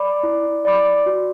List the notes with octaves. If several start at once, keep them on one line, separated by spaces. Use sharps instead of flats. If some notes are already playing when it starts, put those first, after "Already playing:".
Already playing: D5 B5 D6
E4
D5 B5 D6
F#4